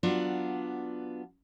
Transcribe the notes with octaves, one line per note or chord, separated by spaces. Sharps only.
F#3 B3 D4 F4 F#5